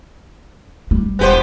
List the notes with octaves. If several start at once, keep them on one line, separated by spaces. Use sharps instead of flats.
G3
E1 B3 G4 C5